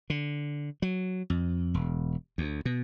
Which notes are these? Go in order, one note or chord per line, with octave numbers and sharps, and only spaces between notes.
D3
F#3
F2
E1
D2
B2